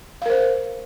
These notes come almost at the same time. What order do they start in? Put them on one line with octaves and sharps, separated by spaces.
F5 A#4 C5